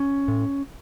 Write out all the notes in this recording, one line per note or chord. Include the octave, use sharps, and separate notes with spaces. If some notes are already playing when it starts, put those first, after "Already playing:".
Already playing: C#4
A2